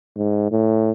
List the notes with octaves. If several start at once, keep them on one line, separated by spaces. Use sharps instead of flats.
G#2
A2